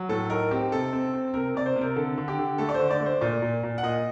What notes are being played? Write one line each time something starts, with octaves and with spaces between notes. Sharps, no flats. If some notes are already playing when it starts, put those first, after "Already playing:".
Already playing: F#3
A2 A4
D#4 A#4
C4 G4
C3 A4
C4
C4
C3 A#4
C3 D5
C5
C3
A#4
D3 A4
D3
G4
D3
A3 A4
D5
C5
D3
D5
A3
C5
A#2 D5
A#2
A#2
F#5
A#2 D#5